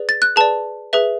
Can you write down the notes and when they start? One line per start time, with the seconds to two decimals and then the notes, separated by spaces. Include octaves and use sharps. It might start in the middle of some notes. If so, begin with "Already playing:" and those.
Already playing: G#4 B4 D5
0.09 A6
0.22 F#6
0.36 G#4 B4 D5 A5
0.93 G#4 B4 E5